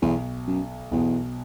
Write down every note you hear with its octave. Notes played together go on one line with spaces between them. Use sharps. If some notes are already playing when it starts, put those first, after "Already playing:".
B1 E2 B2
F#2
B1 E2 B2